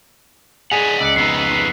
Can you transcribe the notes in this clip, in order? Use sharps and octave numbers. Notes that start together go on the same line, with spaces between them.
G#4 D5 D#5 F#5 B6 F7
C#2 D5 E6 F#6 C#7
F2 B3 D#4 E6 C7